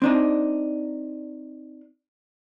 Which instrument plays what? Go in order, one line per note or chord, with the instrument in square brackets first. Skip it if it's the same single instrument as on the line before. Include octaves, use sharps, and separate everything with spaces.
[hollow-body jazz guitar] C4 D4 D#4